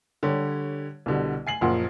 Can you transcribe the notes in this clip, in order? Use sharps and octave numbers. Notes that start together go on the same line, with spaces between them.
D3 G3 G4 C#5
C2 B2 D3 G3
G#5 C7 F#7
F#1 A#2 F3 F#5